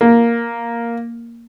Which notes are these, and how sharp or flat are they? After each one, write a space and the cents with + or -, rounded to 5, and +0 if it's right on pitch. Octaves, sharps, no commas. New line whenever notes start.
A#3 +0